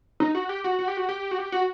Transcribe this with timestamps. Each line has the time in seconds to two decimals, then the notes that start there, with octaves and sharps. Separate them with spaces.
0.20 D#4
0.35 F#4
0.49 G4
0.64 F#4
0.79 F#4
0.88 G4
0.97 F#4
1.09 G4
1.31 F#4
1.38 G4
1.52 F#4